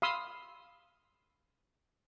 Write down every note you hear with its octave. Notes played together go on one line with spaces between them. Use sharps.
F5 B5 C6 D#6 E6